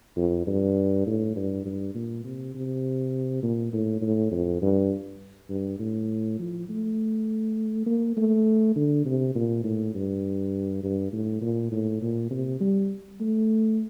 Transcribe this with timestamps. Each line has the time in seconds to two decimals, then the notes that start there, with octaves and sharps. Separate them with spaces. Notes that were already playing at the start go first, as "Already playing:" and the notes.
0.17 F2
0.47 G2
1.07 A2
1.36 G2
1.66 G2
1.95 A#2
2.24 C3
2.55 C3
3.43 A#2
3.73 A2
4.02 A2
4.32 F2
4.62 G2
5.50 G2
5.80 A2
6.39 F3
6.69 A3
7.86 A#3
8.17 A3
8.76 D3
9.05 C3
9.35 A#2
9.64 A2
9.94 G2
10.83 G2
11.13 A2
11.42 A#2
11.72 A2
12.02 A#2
12.31 C3
12.60 G3
13.20 A3